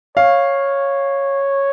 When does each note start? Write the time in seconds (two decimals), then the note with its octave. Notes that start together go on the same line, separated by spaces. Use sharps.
0.17 C#5 F5